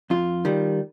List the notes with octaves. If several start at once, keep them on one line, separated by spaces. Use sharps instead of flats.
F2 F4
D#3 G3